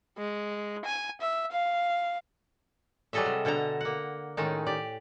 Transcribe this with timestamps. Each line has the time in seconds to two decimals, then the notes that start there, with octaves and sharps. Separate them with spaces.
0.18 G#3
0.85 G#5
1.21 E5
1.52 F5
3.13 F#3 G3 G#4 A4 D#5 E5
3.26 C3
3.45 B2 D3 A4 A5 A#5
3.81 A#3 F#5
4.37 A2 D#3 G#3 C#4 D#4 A5
4.66 G4 D5